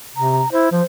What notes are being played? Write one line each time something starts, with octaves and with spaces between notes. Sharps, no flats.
C3 A#5
E4 C5
F3 C5